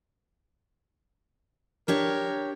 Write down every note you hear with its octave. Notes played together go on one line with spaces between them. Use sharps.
D4 G4 A#4 C#5